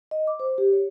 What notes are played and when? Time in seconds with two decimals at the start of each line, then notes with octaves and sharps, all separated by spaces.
0.11 D#5
0.27 D6
0.40 C5
0.58 G4
0.72 C#5